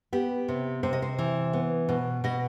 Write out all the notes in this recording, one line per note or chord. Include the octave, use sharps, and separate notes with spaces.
B3 G4
C3
C3 C5
D#5
C5
E3
B3
B2
B2 D#5